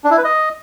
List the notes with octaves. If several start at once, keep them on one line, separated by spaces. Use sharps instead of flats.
D4
E4
B4
D#5